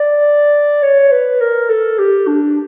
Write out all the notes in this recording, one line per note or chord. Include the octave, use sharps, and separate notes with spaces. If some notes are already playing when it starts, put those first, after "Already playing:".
Already playing: D5
C#5
B4
A#4
A4
G4
D4